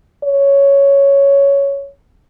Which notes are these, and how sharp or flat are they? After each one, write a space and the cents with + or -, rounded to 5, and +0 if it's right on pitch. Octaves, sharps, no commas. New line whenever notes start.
C#5 +5